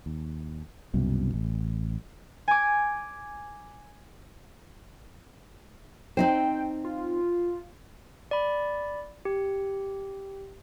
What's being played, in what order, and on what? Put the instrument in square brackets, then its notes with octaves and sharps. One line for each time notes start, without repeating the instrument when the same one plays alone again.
[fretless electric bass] D#2
C2 F#2 B2
A1
[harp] G#5 D6
[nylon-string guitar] C4 D#4 C5 [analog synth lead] G5
[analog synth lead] F4
[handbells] D5 B5
G4